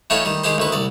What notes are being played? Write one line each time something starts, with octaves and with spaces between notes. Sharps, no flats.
E3 A3 D#4 F4 C#5
D#3 G3
D#3 G#3 G4 C5
D2 D#3 B4
C2 D5